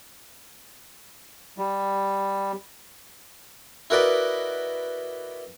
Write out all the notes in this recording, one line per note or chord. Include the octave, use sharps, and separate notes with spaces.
G3
E4 F#4 A#4 B4 D5 D#5